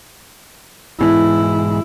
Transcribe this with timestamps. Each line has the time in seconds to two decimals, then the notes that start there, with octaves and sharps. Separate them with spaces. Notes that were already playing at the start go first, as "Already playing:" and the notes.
1.01 G#2 B2 E3 E4